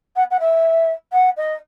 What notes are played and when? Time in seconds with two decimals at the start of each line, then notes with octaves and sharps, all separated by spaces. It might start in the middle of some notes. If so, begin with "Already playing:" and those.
0.16 F#5
0.30 F#5
0.40 E5
1.13 F#5
1.37 D#5